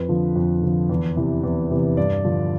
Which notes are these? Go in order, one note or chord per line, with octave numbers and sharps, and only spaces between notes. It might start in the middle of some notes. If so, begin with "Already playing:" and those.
Already playing: F2 B4
D3 F3
F2
D3 F3
E2
C3 E3
E2
C3 E3
G2 D5
D3 F3